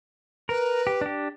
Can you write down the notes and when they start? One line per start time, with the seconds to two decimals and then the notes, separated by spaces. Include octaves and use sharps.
0.49 A#4 B4
0.87 G4
1.01 D4 G4